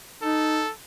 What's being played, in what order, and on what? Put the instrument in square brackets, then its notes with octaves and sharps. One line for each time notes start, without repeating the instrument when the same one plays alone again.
[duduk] D#4 [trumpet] A4